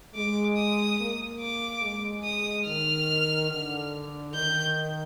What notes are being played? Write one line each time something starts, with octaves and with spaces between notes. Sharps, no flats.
G#3 D6
D#6
A#3
D6
G#3
D#6
D#3 F6
D3
D#3 G6